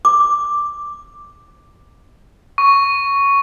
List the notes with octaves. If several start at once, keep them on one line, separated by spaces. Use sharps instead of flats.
D6
C#6